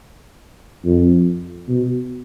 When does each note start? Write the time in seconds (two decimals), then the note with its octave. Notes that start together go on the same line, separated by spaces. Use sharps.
0.85 F2
1.69 B2